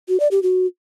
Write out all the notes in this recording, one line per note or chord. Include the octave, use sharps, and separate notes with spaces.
F#4
D5
G4
F#4